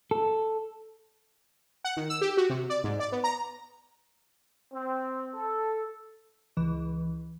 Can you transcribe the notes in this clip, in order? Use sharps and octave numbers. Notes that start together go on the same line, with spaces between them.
A4
F#5
D#3
E6
G4
F#4
C3
D5
G#2
D5
B3
A#5
C4
A4
C#2 E3